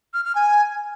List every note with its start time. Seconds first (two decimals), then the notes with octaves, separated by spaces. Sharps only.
0.14 F6
0.24 F6
0.35 G#5